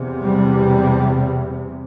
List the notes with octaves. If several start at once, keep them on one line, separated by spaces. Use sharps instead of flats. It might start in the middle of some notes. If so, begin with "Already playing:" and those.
Already playing: E2 C3
G3